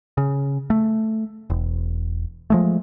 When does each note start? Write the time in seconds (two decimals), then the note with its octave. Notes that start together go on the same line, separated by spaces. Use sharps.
0.17 C#3
0.70 A3
1.50 E1
2.50 F3 G#3 A3